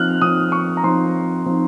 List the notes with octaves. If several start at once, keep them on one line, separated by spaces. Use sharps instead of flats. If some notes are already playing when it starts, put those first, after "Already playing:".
Already playing: F3 C4 D#4 F6 F#6
F3 C4 D#4 D#6
C#6
A#5
F3 C4 D#4 C6
F3 C4 D#4